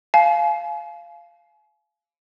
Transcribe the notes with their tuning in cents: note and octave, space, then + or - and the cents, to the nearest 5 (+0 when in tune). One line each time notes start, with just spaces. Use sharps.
F5 -10 G#5 +40